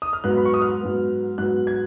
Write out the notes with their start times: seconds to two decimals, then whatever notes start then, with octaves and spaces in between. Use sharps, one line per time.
0.02 D#6
0.13 F6
0.24 G#2 F#3 B3 F#6
0.37 B5
0.45 C#6
0.54 D#6
0.62 F6
0.81 G#2 F#3 B3
1.38 G#2 F#3 B3 F#6
1.67 G#6